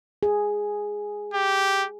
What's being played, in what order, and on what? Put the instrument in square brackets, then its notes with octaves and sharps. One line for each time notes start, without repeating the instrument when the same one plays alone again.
[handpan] G#4
[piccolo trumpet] G4